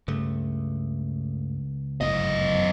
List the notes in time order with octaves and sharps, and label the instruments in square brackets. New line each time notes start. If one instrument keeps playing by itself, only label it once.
[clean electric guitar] C#2 [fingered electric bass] G2 A3
[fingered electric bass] G1 A2 [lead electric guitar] F#2 D#5